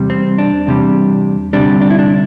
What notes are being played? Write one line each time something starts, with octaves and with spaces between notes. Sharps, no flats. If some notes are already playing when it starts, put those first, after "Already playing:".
Already playing: E2 C3 G3
C4
D4
E2 C3 G3
D2 C3 G3 D4
D4
E4
D4